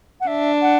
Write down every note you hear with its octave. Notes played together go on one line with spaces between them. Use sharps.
F#5
D4 E5
F#5